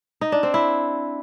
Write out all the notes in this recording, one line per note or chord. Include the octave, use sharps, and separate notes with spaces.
D#4
D4
C4
E4